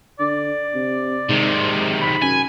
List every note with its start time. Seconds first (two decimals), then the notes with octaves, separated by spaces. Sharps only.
0.20 D3 D5
0.75 C3
1.29 G#2 C3 D#3
2.02 B5
2.22 F#2 G#5